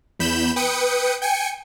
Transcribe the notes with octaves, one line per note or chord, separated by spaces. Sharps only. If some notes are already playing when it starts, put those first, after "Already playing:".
E2 B5 G6 E7
B4 G5 D#6 C#7
G5 G#5 C#7